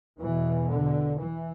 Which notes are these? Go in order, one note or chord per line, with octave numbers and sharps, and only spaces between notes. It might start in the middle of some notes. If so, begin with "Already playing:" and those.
E2 B2 E3
D3
E3